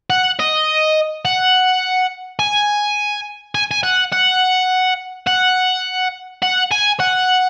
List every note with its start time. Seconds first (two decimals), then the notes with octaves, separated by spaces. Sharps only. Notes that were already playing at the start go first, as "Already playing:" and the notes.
0.10 F#5
0.39 D#5
1.25 F#5
2.39 G#5
3.55 G#5
3.71 G#5
3.83 F#5
4.13 F#5
5.27 F#5
6.42 F#5
6.71 G#5
7.00 F#5